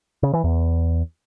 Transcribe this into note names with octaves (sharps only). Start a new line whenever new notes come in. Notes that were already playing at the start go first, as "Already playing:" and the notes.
C#3
E3
E2